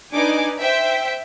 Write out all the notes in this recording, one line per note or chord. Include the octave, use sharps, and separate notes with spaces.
D4 D#4 B4 G#5 D6
C5 E5 G5